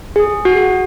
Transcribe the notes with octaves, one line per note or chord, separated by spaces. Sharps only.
G#4
F#4